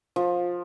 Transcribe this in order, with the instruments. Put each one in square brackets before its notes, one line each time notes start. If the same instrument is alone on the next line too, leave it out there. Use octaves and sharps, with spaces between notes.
[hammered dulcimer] F3